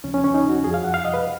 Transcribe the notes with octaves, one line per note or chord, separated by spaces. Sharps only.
D#2 C#3 F3 C#4
C#4
C#4
D#4
F#4
F2 F3 G#4
F5
F#5
F5
D#5
B4